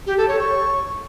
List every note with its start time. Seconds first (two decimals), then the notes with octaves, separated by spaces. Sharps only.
0.07 G4
0.17 A4
0.28 C#5
0.39 C#6